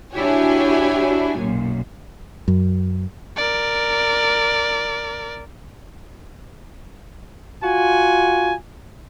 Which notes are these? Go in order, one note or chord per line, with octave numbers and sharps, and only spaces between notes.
D4 E4 F#4 G4 C#5 G#5
B1 F#2 A#2
F#2
A#4 D5
F4 F#4 G#5